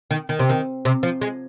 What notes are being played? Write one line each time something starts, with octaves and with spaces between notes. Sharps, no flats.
D#3
D#3
C3
D#3
C3
F3
G#3